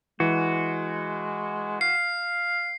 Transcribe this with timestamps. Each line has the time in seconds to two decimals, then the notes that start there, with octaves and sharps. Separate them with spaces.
0.20 E3 G#3 F#4
1.81 F5 C7